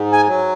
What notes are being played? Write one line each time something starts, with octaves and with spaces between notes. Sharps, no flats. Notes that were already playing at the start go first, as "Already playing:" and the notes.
Already playing: G#2
G#5
F#3